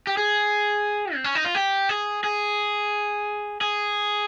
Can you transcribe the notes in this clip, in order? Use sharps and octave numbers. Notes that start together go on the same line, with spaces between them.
G4
G#4
C4
C#4
D#4
F4
G4
G#4
G#4
G#4